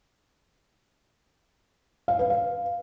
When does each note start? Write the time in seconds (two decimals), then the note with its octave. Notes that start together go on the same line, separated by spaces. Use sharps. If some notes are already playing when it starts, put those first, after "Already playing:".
2.08 F5
2.19 B4
2.30 F5